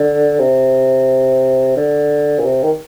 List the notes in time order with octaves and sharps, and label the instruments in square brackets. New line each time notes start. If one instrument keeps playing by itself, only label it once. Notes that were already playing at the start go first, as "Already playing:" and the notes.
Already playing: [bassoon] D3
C3
D3
A#2
C3
D#3